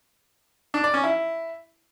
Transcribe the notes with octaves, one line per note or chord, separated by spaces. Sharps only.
D4
D5
C#4
E4